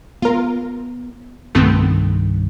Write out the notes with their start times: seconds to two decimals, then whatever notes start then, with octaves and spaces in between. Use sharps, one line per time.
0.22 B3 F4 A#4
1.55 C2 G2 D#3 A3 B3 C4